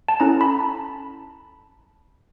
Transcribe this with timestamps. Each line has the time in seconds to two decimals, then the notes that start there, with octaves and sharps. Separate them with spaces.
0.09 A5
0.20 C#4 E4 A4 A#5
0.41 B5
0.60 A5